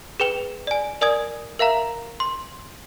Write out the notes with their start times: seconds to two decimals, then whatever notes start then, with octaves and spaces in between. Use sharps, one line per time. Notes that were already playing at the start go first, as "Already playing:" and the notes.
0.20 G#4 B4 G5 F7
0.67 D5 G#5
1.01 A#4 D5 G#5 D#6 G#6
1.59 A#4 E5 F5 A#5
2.20 C6